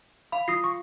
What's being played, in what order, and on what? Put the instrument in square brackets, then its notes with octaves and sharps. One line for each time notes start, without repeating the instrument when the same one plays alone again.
[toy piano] F5 B5
[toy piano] F4 [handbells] D#6 A#6 C7
[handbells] C#6